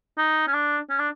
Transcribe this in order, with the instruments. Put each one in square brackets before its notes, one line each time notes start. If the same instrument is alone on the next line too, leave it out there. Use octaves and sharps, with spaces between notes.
[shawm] D#4
C#4
D4
C#4
D4